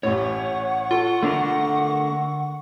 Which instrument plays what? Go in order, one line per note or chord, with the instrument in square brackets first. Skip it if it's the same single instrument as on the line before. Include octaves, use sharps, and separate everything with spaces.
[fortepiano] A1 A2 [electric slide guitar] C#5 [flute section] F#5 C#6
[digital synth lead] F4 [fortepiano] A4
[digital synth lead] D3 [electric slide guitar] A3 D4 A#4